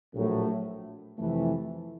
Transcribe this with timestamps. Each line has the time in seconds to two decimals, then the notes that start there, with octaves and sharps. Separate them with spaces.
0.14 A#1 A2 F#3 A3
1.17 F2 C3 E3 A3